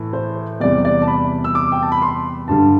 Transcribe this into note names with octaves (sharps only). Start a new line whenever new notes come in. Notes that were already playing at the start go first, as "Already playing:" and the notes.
Already playing: A2 E3
C5
E2 C3 G3 D5
D5
A5
B5
E6
D6
G5
A5
B5
C6
G2 D3 G3 A5